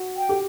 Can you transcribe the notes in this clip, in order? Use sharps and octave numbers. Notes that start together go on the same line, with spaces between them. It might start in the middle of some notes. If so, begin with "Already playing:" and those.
Already playing: F#4
G5
G4